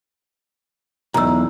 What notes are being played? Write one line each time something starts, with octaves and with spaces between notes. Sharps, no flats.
B1 E2 A#5 E6